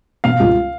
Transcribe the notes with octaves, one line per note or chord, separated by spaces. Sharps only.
B2 F5
C#2